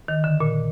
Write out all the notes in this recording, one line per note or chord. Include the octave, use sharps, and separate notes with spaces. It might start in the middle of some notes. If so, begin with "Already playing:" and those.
D#3
D3
A#2